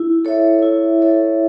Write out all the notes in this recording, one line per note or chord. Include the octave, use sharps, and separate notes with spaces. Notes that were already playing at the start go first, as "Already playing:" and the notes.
Already playing: E4
A4 C#5 E5
E4
A4 C#5 E5